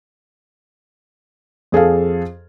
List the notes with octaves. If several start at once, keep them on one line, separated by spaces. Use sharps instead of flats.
F2 G#4 A4 F5